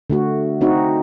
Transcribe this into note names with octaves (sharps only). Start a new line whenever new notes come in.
D3 A3 F#4
C4 D#4 F#4